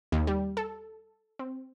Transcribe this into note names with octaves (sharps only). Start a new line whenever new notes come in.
D#2
G3
A4
C4